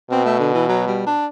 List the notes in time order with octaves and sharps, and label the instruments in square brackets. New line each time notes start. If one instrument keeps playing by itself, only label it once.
[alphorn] B2 [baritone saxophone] C4
[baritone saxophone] A3
D3
E3
F#3
G3
D4